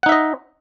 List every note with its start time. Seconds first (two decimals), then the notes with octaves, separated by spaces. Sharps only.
0.03 F#5
0.06 D#4
0.09 E5
0.12 D#5